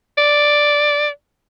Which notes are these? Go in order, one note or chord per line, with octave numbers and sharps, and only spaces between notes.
D5